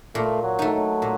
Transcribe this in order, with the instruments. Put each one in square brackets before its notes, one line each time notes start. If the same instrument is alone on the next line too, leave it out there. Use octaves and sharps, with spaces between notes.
[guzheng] A#2 [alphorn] A3
[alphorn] F#3
[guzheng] A3 D#4
[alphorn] F#3
[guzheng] A#2